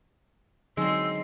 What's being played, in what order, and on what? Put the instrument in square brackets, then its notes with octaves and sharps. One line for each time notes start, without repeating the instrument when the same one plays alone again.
[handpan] D3 F#3 D#4 [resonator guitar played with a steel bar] G#3 [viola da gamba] C4 [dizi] E6